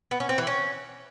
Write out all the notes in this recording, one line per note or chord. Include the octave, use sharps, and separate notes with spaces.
B3
C#4
C4
E3
C#4